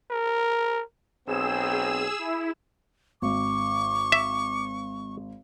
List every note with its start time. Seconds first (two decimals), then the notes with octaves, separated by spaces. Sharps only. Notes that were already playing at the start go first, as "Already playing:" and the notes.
0.11 A#4
1.27 B1 C4 G#4 E6 E7
2.19 E4
3.22 G#1 C#6 D6
4.12 E5